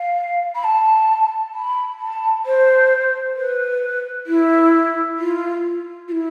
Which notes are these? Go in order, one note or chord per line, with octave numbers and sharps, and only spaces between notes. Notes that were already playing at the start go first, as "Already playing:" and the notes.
Already playing: F5
B5
A5
B5
A5
C5
B4
E4
F4
F4
E4